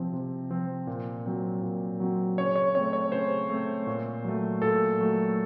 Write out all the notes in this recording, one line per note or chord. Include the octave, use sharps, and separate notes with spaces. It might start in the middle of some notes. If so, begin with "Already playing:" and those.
Already playing: C3 F3 C4
C3
F3 C4
A#2
F#3 C4
A#2
F#3 C4
C#3 C#5
C#5
A3 C4 C#5
C#5
C#3 C5
A3 C4
A#2
F#3 A3
A#2 A4
F#3 A3